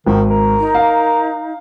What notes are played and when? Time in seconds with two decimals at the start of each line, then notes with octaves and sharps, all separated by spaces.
0.07 G#1 D#3
0.30 A#4
0.60 D#4
0.74 F5